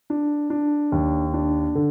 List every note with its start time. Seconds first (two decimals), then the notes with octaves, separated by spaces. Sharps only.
0.10 D4
0.50 D4
0.92 D#2
1.34 D4
1.75 D3